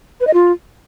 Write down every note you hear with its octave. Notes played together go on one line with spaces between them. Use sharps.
B4
D#5
F4